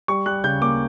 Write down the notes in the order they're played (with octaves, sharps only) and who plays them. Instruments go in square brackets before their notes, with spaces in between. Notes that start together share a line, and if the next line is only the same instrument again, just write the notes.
[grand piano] G3 C#6
G3 F#6
C#3 G6
A#3 D6